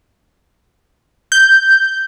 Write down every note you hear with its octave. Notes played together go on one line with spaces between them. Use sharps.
G6